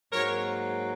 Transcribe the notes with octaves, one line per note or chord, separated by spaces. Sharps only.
G#2 F#3 A#3 A#4 C#5